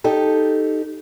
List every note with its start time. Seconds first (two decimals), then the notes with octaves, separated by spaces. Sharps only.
0.04 D#4 G4 A4